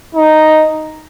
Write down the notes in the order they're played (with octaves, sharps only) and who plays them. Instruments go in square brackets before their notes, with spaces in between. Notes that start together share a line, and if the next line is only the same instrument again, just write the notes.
[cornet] D#4